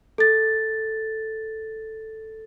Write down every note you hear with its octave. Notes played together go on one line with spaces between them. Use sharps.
A4 A6